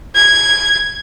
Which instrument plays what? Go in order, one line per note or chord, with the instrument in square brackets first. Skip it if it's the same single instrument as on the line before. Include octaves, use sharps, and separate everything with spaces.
[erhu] G#6